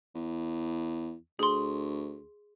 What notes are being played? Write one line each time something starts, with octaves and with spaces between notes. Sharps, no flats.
E2
D2 G#4 C6